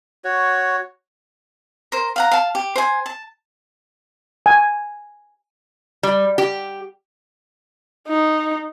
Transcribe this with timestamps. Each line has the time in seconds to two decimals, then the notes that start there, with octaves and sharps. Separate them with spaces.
0.24 F#4 C#5
1.92 A#4 C5
2.16 F5 F#5 A#5
2.31 F5 A5
2.55 G4
2.76 C5 G#5
3.06 A5
4.46 G#5
6.03 G3
6.38 G4
8.08 D#4